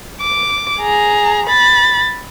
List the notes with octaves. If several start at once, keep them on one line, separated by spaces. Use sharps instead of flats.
D6
G#4 A#5
B5 A6